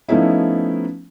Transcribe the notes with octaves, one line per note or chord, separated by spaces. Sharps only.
F3 A3 B3 C#4 D#4 E4